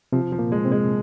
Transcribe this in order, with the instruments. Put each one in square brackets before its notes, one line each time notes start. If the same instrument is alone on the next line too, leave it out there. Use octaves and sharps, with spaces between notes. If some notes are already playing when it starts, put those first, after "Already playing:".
[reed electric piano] C3 C4 [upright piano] F3
[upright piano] F3
[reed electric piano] A#2 A#3
[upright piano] G#3
[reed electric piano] C3 C4
[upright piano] G#3